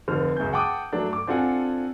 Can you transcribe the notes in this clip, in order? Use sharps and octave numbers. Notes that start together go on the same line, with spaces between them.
F1 D3 C5 F6
C#2 F#2 G#5 G6
F#5 G5 A5 D6 D#6
F#3 A3 D4
D6
C4 D4 F4 A4 F#5 G#5